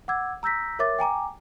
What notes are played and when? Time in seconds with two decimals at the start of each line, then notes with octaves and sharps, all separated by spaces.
0.08 F#5 D6 E6 G#6
0.43 A#5 E6 G6 A#6 B6
0.79 A#4 C#5 E5 D6 A6
0.99 G5 G#5 A#5 D6